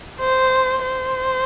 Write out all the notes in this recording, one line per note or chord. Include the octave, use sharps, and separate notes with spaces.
C5
C5